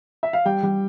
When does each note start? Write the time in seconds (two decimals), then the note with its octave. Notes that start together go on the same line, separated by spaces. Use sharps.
0.23 E5
0.33 F5
0.45 G3 G5
0.63 G3